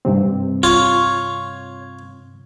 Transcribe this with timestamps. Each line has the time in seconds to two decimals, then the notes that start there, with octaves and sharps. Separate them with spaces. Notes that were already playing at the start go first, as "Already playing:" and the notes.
0.05 G2 C3 C4
0.63 F4 C#5